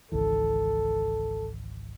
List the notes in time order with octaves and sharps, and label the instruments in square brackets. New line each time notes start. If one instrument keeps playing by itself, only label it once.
[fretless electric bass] G#1 C#2 E3 [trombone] A4